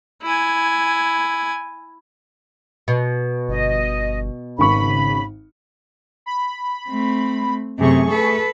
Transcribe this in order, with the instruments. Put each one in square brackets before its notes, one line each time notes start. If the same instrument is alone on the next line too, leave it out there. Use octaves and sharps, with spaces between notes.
[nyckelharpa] E4 G#5
[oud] B2
[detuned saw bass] G1 [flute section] D#5
[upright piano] G#1 C#6 [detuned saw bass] C#3 [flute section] B5
[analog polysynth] B5
[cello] A3 C4
[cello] F#2 C3 [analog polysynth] A3 G#4 C#6
[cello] A4 B4